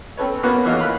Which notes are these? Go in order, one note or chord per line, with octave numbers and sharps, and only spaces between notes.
C4 C#4 A4 B4 C#5
A#3 B3 C#4 F#4 B4 F#5
E3 A3 A#3 D#4 F4 F#4
F5 B5 F#6